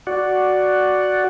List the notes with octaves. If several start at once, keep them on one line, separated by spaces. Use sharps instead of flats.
F#4 D5 F#5